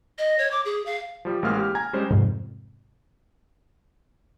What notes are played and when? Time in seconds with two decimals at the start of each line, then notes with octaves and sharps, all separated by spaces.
0.18 D#5
0.38 C#5
0.51 D6
0.65 G#4
0.86 F5
1.25 F3 G3
1.43 A1 G#3 A#3 F5 F6
1.58 G4
1.75 G#5 A#5 G#6
1.93 G3 G#3 C#4 C5
2.11 F2 G#2 C3